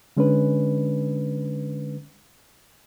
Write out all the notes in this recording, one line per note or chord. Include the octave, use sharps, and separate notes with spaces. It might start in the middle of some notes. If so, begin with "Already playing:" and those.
D3 G#3 C#4 D4 B4